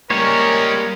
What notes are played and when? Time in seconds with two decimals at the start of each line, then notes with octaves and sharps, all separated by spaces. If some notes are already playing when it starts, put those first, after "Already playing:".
0.10 G3 G#3 A#3 C#4 A#4 C#5